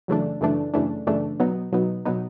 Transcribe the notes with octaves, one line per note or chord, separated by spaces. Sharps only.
F#2 C#3 E3 A3 D4
F#2 C#3 E3 A3 D4
F#2 C#3 E3 A3 D4
F#2 C#3 E3 A3 D4
B2 F#3 B3 D#4
B2 F#3 B3 D#4
B2 F#3 B3 D#4